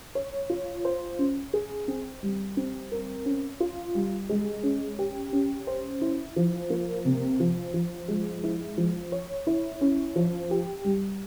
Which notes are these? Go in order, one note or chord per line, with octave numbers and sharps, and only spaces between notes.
C#5
F4
C5
C#4
G#4
C4
G3
C4
A#4
C#4
F4
G3
G#3
C#4
G4
C#4
C5
E4
F3
A#3
C3
F3
F3
G#3
E4
F3
C#5
E4
C#4
F3
G4
G3